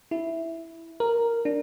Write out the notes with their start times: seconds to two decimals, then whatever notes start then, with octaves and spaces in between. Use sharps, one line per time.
0.11 E4
1.00 A#4
1.45 D4